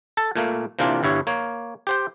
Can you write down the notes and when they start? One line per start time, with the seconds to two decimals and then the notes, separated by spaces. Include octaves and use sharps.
0.17 A4 A5
0.35 A#2 A3 A#3
0.79 C3 E3 A#3 D4 F4
1.03 G1 G2 E4 C#5
1.27 A#3 C#5
1.87 G4 C5 G5